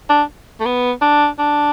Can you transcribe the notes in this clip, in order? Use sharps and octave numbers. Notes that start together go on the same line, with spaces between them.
D4
A3
B3
D4
D4